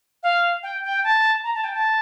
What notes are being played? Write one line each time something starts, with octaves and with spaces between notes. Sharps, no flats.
F5
G5
G5
A5
A#5
A5
G5
A5